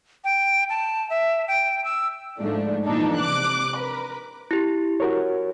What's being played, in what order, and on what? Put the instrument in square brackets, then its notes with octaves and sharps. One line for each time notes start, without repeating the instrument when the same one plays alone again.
[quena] G5
A5
E5
G5
E6
[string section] G#2 F3 A3 D4
A#2 E3 F3 D4 D#4 A4
C3 D6 F#6
A#4 B4
[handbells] E4 G4
[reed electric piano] F#4 A#4 C#5